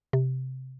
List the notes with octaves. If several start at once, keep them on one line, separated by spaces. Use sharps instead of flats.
C3